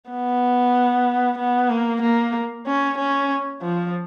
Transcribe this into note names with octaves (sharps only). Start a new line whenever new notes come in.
B3
B3
A#3
A#3
C#4
C#4
F3